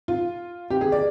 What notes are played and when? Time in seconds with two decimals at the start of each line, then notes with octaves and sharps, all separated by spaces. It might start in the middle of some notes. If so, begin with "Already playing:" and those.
0.08 F4
0.70 G4
0.81 G#4
0.92 D5